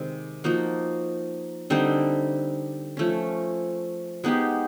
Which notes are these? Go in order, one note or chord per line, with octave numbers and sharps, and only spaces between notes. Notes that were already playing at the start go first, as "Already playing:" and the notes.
Already playing: C3 D#3 G#3
F3 A#3 D#4 F#4
D3 G3 C4 D#4
F3 A3 C#4
G#3 B3 D#4 G4